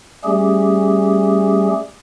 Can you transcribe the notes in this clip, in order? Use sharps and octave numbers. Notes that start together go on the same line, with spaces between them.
G3 A3 C#4 G4 G#4